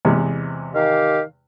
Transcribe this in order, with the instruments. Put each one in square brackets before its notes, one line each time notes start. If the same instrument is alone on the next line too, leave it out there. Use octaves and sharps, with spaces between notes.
[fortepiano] E2 C3 G#3
[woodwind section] D#3 G4 F5